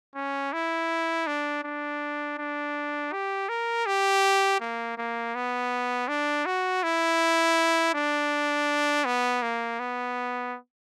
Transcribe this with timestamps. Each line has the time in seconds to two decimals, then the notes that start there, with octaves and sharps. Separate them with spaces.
0.15 C#4
0.53 E4
1.27 D4
1.63 D4
2.38 D4
3.13 G4
3.49 A#4
3.86 G4
4.60 A#3
4.98 A#3
5.35 B3
6.08 D4
6.46 F#4
6.84 E4
7.94 D4
9.05 B3
9.42 A#3
9.80 B3